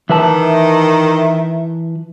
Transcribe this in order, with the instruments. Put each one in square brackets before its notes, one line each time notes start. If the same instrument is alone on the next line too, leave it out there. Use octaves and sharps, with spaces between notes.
[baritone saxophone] D#3 [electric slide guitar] E3 B4 A5 [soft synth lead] E5